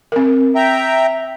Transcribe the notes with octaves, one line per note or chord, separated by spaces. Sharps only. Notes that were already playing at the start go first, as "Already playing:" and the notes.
C4 A#4
E5 G5 A#5